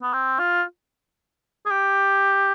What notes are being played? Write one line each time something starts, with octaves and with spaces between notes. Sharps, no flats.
B3
C4
F4
G#4
G4